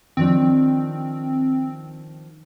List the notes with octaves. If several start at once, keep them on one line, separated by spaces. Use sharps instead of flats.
D#3 F3 C4 D4